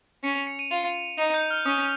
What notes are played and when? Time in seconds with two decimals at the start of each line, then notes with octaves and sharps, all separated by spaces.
0.23 C#4 C#7
0.35 F7
0.47 C#7
0.59 D#7
0.71 F4 F7
1.18 D#4 F7
1.34 G6
1.51 F6
1.66 C#4 D#6